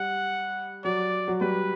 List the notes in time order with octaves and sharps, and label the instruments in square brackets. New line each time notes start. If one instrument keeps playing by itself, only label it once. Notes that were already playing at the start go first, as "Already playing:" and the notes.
Already playing: [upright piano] G3 [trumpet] F#5
[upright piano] F#3 [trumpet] D5
[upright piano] F#3
[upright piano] G3 [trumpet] B4